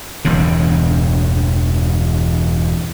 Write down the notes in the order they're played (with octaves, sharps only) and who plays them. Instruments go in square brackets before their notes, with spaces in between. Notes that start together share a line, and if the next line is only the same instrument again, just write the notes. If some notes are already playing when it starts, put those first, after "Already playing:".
[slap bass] E1 E2 G2 C#3